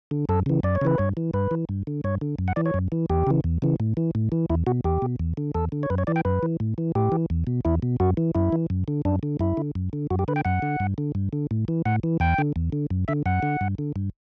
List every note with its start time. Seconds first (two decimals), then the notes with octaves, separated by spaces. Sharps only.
0.11 D3
0.29 F#2 A4
0.46 C#3 E3
0.63 F#2 D5
0.75 C#5
0.81 C#3 E3 B4
0.98 G2 C#5
1.17 E3
1.34 G2 B4
1.51 E3
1.69 G2
1.87 D3
2.04 G2 C#5
2.21 D3
2.39 F#2
2.48 F#5
2.56 E3 D5
2.66 C#5
2.74 F#2
2.92 E3
3.10 E2 G4
3.27 C#3 E3
3.44 E2
3.62 C#3 E3
3.80 A2
3.97 E3
4.15 A2
4.32 E3
4.50 E2 E4
4.67 B2 F#4
4.84 E2 G4
5.02 B2
5.19 E2
5.37 D3
5.55 E2 A4
5.72 D3
5.83 C#5
5.90 F#2 B4
5.98 C#5
6.07 E3 D5
6.16 G5
6.25 F#2 B4
6.43 E3
6.60 A2
6.78 E3
6.95 A2 G4
7.12 E3
7.30 E2
7.47 B2
7.65 E2 E4
7.82 B2
8.00 F#2 F#4
8.17 E3
8.35 F#2 E4
8.53 E3
8.70 F#2
8.88 D3
9.05 F#2 D4
9.23 D3
9.40 F#2 E4
9.57 D3
9.75 F#2
9.93 D3
10.10 F#2 F#4
10.19 G4
10.28 D3 B4
10.36 G5
10.45 F#2 F#5
10.62 D3
10.80 G2
10.98 D3
11.15 G2
11.33 D3
11.51 A2
11.68 E3
11.86 A2 F#5
12.03 E3
12.20 E2 G5
12.38 D3
12.56 E2
12.72 D3
12.90 F#2
13.08 D3 E5
13.26 F#2 F#5
13.43 D3
13.61 G2
13.78 D3
13.96 G2